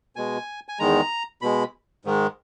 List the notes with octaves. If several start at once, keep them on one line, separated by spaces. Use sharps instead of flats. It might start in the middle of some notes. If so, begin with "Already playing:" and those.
B2 G#3 G#5
G#5
E2 D#3 G#3 A#5
B2 G#3 B5
G#2 D#3 G#3